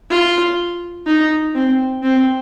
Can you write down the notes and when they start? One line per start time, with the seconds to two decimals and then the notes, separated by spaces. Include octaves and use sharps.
0.10 F4
1.07 D#4
1.55 C4
2.03 C4